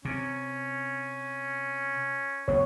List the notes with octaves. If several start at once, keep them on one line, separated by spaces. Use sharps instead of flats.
C3 C#4
F#1 B3 C#5